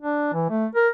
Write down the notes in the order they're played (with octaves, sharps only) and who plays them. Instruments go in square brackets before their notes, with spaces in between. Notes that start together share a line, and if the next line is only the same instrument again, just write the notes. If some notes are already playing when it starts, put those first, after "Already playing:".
[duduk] D4
E3
A3
A#4